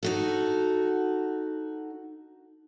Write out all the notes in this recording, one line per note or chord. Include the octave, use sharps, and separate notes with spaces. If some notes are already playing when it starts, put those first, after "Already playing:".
D#4 F#4 A4